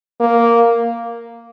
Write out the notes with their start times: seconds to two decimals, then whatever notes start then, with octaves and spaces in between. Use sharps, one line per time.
0.21 A#3